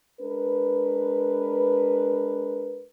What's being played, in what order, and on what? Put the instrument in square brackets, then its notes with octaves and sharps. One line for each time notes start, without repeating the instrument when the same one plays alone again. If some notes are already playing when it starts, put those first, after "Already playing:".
[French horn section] G#3 D4 A#4 B4